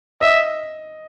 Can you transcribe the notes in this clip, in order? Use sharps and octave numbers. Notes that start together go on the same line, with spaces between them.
D#5 E5